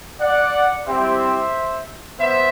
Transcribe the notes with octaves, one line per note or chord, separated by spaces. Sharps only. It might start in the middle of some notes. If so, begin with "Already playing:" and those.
D5 F#5
G3 C4 E4 G4 C5 E5
B3 C5 E5